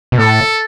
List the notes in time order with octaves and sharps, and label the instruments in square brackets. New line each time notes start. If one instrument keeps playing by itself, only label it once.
[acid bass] B2
[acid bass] A2 [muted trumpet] A4